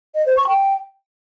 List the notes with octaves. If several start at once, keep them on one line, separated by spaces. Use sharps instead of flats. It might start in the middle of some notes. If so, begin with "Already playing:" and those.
D#5
C5
C#6
G5